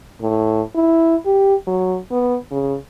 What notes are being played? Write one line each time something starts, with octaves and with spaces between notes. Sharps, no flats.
A2
E4
G4
F#3
B3
C#3